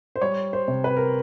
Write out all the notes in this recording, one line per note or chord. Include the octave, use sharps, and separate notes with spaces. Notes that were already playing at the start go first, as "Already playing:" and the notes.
C5
G3 C#5
C5
C3
B4
A#4